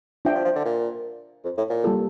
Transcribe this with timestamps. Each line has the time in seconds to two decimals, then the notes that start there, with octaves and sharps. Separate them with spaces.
0.25 D4 F4 C5 E5 G5
0.35 F3
0.45 F3
0.55 D3
0.65 A#2
1.44 F2
1.58 A2
1.70 A#2
1.84 G3 A#3 F4 A4